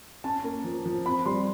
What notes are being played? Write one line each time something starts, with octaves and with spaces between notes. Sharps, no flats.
C#4 A5
A#3
F3
F3
C4 B5
G3 C6